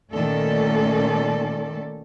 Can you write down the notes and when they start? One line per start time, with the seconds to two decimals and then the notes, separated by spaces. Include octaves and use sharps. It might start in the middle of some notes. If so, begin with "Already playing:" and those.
0.13 A#2 D#3 A3 C#4 A4 D5